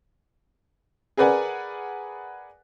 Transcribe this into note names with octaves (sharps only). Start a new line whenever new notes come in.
G#4 A#4 B4 D5 F#5 G#5